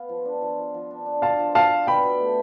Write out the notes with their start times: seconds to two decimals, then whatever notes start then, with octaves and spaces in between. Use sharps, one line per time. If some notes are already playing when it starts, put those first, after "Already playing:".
Already playing: B3 F5
0.09 F3
0.25 D4
0.41 F3
0.58 F3
0.74 F3
0.91 D4
1.06 D4
1.22 D4 F5 A5
1.39 F3
1.55 F3 F5 A5
1.71 D4
1.87 B2 G5 B5
2.03 B2
2.20 A3